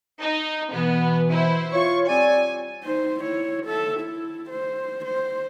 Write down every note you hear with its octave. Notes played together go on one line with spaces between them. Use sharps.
D#4
B2 E3 B3
E4 C5
F4 C#5 C#6
G3 C4 D5 G#5
D#4 C5
E4 C#5
A4 E5
E4
C5
C5